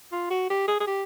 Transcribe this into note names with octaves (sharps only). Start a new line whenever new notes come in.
F4
F#4
G4
G#4
G#4
G4